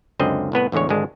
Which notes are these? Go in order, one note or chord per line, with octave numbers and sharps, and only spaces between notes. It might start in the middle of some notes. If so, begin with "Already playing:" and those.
C#2 F#2 D3 C4 D#5
C2 A2 B3 B4
A1 E2 D3 G#3 C#5
G#1 D3 G#3 D4